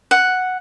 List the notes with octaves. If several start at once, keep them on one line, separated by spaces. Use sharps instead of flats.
F#5